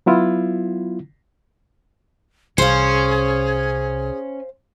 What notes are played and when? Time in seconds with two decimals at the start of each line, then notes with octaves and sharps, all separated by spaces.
0.06 F#3 B3 E4 F4
2.58 C2 C#4 G#4 C5 F5